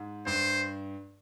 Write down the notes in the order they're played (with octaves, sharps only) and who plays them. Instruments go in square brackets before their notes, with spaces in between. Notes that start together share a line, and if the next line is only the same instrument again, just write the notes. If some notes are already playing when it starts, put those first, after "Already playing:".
Already playing: [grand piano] G#2
[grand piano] G2 [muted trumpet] C5